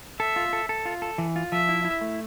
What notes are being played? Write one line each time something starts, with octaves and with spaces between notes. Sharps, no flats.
A4 E5
F4
A4
A4
F4
A4
E3
F4
F3 E5
E4
E4
A3